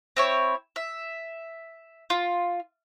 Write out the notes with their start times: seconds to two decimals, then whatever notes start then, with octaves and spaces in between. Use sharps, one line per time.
0.17 C4 E4 C#5
0.76 E5
2.10 F4